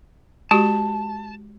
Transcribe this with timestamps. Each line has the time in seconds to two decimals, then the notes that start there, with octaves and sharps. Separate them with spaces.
0.51 G#3 F#4 G4 A5